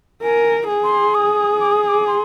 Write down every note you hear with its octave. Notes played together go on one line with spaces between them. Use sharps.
A#4 G#5
G#4
C6
D#6
D6
D#6
D#6
D6
C6